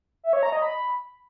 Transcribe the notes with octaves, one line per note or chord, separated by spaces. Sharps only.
E5
C#5
A#5
D#5
B5